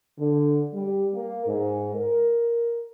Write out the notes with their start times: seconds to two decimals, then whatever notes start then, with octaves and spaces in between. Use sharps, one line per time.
0.18 D3
0.72 G3
1.14 A#3
1.45 G#2
1.94 A#4